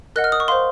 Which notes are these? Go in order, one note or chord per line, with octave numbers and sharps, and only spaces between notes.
A#4 D#5 F#5 F#6
F6
D#6
C#6
C5 F5 C6